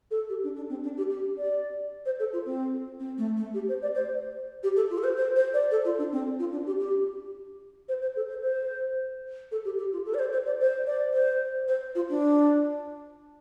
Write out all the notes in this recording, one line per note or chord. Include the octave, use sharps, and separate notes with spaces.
A4
G4
D4
D4
C4
D4
G4
G4
D5
C5
A4
F4
C4
C4
A3
A3
G4
C5
D5
C5
G4
A4
F4
A4
C5
C5
C5
D5
A4
F4
D4
C4
F4
D4
G4
G4
C5
C5
A4
C5
C5
A4
G4
G4
F4
A4
D5
C5
C5
D5
C5
D5
C5
C5
F4
D4